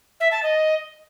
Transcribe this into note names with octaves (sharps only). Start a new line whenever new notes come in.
E5
A5
D#5